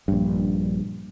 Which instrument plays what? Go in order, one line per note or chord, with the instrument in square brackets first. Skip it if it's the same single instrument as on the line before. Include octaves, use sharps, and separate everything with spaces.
[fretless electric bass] A#1 G2